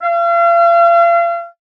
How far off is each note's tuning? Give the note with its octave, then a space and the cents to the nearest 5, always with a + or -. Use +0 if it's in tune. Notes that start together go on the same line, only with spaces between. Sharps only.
F5 -40